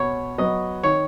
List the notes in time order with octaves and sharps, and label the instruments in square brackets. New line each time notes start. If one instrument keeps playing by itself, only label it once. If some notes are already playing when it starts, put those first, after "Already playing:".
Already playing: [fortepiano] B2 C#5
F#3 B3 D#5
D#3 C#5